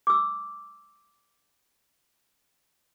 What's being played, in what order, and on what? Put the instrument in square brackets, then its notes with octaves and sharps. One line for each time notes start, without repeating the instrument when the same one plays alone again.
[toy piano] D6 E6